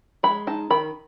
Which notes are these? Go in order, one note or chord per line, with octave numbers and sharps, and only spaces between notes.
G#3 B5
D#4 A5
D#3 B5